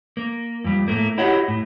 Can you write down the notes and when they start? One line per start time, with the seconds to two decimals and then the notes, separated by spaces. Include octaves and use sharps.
0.17 A#3
0.64 F2 G3
0.88 A2 A3 A#3
1.18 E4 F#4 G4 C#5 D#5 F#5
1.48 A2